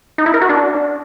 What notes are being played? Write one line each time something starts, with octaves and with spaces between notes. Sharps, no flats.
D#4
E4
A#4
F#4
D4